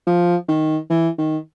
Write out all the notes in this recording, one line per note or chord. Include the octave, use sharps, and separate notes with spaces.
F3
D#3
E3
D#3